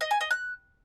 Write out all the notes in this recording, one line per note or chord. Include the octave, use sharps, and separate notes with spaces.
D#5
G#5
D#5
F#6